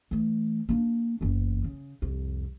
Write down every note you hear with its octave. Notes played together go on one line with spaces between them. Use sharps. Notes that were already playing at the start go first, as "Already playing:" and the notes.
E3 A3
A#3 D4
F#1 E2
C#3
C2 F2